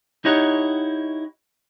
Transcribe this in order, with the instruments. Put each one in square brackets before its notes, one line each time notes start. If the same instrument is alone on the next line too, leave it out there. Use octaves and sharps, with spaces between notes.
[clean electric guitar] D#4 E4 G4 C#5 D#5 F#5